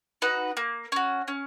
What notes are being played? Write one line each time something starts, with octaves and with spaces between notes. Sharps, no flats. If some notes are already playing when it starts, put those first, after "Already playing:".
D#4 F#4 B4
A#3
C#4 F#4
C#4